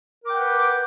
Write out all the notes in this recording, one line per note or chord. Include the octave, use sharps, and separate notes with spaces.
A#4 B4 F#5 G5 D6